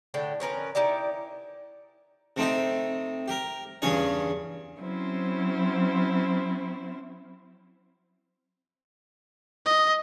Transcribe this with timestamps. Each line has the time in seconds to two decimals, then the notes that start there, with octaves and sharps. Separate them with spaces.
0.14 A2 D3 G5
0.40 F3 C#4 A#4 B4
0.75 D#4 E4 G4 D5
2.37 C3 A3 C4 D#4 G4
3.28 G4 A#4
3.82 E2 G2 C#3 C#4 G#4 C#5
4.79 F#3 C4 C#4 E4 C5
9.66 D#5